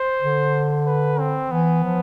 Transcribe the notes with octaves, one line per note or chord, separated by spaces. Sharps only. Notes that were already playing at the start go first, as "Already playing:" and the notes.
Already playing: C5
D3
B4
C4
E3 B3
F3